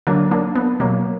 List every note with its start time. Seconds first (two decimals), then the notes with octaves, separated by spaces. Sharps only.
0.07 D3 F#3 A#3 D4
0.31 A#3 D4
0.56 B3
0.80 B2 F#3 A#3